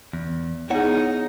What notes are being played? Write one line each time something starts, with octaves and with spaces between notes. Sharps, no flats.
E2
B3 D#4 E4 G#4 C#5 F#5